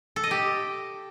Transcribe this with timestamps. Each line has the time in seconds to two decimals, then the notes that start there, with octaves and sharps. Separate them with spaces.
0.16 A4
0.24 D#5
0.31 G4